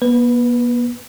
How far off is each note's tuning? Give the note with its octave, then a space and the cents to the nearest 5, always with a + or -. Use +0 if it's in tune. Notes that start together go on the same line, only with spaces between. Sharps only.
B3 -45 B4 +0